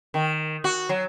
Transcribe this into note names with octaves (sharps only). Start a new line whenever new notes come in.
D#3
F#4
F#3